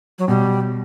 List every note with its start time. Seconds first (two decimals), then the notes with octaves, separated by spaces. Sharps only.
0.19 F#3
0.28 B2 G3